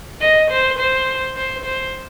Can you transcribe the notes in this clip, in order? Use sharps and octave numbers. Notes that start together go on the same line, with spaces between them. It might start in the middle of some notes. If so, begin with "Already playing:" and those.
D#5
C5
C5
C5
C5